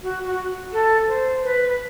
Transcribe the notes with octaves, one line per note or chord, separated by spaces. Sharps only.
F#4
F#4
A4
C5
B4